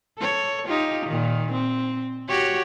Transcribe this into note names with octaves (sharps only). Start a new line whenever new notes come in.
A4 C#5
D#4 F4 G4
A#2 D#3
C4
F#4 G4 C#5